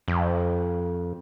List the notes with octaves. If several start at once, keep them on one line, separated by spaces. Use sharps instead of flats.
F2